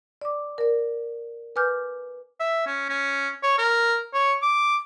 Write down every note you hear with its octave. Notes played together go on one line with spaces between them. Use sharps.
D5 D6
A#4 D5
B4 G#5 D6 F6 G6
E5
C#4
C#4
C#5
A#4
C#5
D6